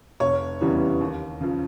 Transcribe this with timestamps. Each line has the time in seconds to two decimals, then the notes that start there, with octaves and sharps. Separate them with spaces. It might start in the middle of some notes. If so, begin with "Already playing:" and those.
0.20 F1 C#5
0.61 E2 C#3 E3 G3
1.01 D#2
1.41 C#3 F3